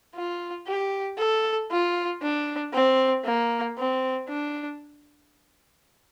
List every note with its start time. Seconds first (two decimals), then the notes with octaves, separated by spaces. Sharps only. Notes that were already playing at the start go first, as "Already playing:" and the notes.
0.15 F4
0.67 G4
1.18 A4
1.71 F4
2.22 D4
2.74 C4
3.25 A#3
3.77 C4
4.29 D4